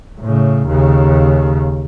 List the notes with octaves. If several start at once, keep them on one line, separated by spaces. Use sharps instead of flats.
A2 C#3
D#2 C#3